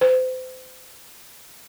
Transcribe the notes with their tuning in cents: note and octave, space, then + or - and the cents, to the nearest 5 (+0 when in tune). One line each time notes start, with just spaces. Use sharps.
C5 -35